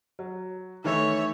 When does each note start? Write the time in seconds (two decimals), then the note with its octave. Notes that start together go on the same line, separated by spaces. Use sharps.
0.19 F#3
0.84 D#3 E3 A3 C#5 E5